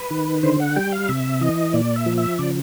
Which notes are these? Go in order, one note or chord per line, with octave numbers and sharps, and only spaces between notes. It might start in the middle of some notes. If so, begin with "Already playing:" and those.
Already playing: B4
D#3
D3 C5
F#5
G3 G5
F5
C3 E5
E3 D#5
A#2 D5
E5
F3
E5
C#3 D5